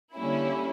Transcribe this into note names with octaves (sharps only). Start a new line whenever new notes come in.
D3 G3 A#3 C#4 E4